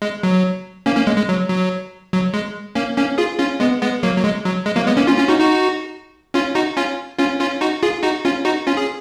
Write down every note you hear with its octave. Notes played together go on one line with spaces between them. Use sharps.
G#3
F#3
A#3 C#4
A#3 C#4
G#3
G#3
F#3
F#3
F#3
G#3
A#3 C#4
A#3 C#4
F4 G#4
C#4 F4
G#3 B3
G#3 B3
F#3 A#3
F#3
G#3
F#3
G#3
F#3 A#3
G#3 B3
A#3 C#4
C#4 F4
C#4 F4
D#4 F#4
D#4 F#4
C#4 F4
D#4 F#4
C#4 F4
C#4 F4
C#4 F4
D#4 F#4
F4 G#4
D#4 F#4
C#4 F4
D#4 F#4
C#4 F4
G#4